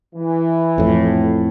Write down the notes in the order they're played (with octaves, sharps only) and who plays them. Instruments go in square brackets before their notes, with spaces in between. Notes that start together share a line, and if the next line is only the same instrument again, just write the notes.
[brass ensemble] E3
[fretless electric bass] F2 A2